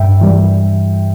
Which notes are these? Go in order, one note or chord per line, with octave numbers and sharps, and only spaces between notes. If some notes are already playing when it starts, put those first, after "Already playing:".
Already playing: G2 E5 G5
E3 G3